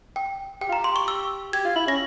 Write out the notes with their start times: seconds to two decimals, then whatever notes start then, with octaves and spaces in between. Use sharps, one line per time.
0.16 G5
0.61 G4 G5
0.69 F4
0.72 A#5
0.78 G4
0.84 C6
0.96 C#6
1.08 E6
1.53 G4 G#6
1.65 F4
1.76 E4
1.87 C#4 A#6